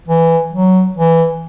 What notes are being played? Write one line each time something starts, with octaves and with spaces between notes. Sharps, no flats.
E3
F#3
E3